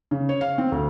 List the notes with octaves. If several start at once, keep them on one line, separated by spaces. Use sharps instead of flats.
C#3
C#5
F5
C4
D2